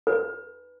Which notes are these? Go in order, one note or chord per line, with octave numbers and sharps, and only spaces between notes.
B4